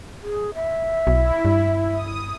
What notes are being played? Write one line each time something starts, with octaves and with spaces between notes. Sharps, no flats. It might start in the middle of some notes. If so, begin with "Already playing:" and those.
G#4
E5
B1 E4
G2
D#6